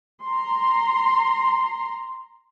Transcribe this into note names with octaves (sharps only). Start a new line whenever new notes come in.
A#5 C6